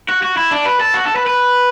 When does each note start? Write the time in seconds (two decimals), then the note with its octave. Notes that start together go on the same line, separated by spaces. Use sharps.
0.09 F#4
0.22 F#4
0.37 E4
0.51 D4
0.65 B4
0.80 A4
0.94 F#4
1.05 A4
1.16 B4
1.27 B4